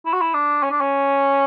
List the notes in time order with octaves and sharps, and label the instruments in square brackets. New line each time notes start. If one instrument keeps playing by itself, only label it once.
[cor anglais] E4
F#4
E4
D4
C#4
D4
C#4